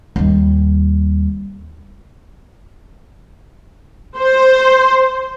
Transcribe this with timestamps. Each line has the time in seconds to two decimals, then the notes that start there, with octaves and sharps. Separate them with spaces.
0.16 D#2 G3
4.17 C5